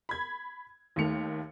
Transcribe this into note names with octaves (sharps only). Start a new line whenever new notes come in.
B5 G#6
D#2 D#3 A3 C#7 F7